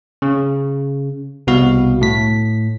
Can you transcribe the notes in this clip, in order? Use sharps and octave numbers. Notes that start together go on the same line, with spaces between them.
C#3
C2 B2 F#4 F5
A2 B6